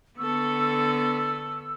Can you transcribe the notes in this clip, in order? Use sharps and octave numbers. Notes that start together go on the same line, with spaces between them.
D3 B3 A4 C#6 E6